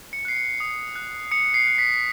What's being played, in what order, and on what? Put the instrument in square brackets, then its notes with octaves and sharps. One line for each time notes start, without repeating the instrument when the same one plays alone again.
[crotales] C#7
F#6 C7
C#7
D#6
F#6
D#6 C#7
C7
F#6
B6